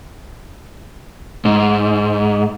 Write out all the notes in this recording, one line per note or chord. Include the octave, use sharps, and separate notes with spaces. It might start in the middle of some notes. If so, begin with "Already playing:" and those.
G#2